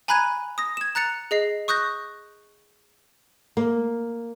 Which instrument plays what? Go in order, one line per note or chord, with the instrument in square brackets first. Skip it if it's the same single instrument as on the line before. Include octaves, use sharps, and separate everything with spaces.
[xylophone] G#5 A#5 B5 F#6 G#6 D#7
D#6 A#6
G#6 E7
A#5 F#6 A6 C#7 F7
G#4 D#5 C7
C#6 D#6 F#6 G6 A#6
[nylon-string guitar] A#3